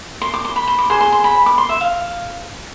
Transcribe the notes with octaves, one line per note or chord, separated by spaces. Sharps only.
C6
D6
C6
B5
C6
D6
G#4 C5 C6
C6
C6
B5
D6
C6
E5
F5